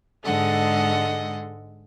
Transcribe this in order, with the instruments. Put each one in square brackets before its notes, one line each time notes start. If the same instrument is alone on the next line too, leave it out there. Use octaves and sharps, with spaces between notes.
[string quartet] G#2 D3 G#3 A4 D#5 F#5